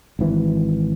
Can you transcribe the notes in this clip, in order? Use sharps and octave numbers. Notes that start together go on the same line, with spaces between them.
G#1 E3